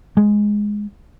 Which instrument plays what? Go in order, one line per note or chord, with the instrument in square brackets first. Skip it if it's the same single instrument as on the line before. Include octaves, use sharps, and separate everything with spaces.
[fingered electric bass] G#3